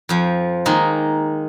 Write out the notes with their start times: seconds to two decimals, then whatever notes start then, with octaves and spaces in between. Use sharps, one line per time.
0.09 F2 F3
0.66 D#3 G#3 A#3